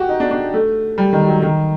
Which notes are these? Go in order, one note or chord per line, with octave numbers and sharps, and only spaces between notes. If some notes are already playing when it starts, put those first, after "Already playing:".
Already playing: F#4 G4
D#4
D4
D4
A3
G3
D#3
F#3
D#3